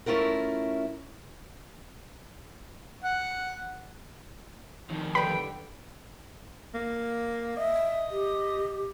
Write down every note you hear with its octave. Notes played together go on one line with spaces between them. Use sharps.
A3 C#4 E4 F4 A#4
F#5
F2 D#3
D3 G3 B4 G5 B5
A#3
D#5 E5
G4